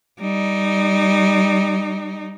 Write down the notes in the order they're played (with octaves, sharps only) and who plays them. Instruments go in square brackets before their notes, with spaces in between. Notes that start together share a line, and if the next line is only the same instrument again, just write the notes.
[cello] G3 D#4